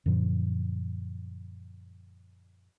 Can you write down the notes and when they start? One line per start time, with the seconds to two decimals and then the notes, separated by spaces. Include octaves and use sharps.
0.06 F#2 A#2 D3 F3